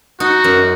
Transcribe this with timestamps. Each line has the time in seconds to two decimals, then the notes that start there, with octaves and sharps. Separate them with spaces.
0.20 D#4 F#4
0.44 F#2